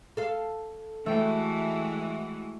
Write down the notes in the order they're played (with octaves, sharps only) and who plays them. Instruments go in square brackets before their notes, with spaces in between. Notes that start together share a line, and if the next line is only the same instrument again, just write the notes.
[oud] A4 F5
[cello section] E3 G#3 F#4 [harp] A3 G5